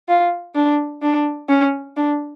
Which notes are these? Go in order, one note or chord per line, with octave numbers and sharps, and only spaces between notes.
F4
D4
D4
C#4
D4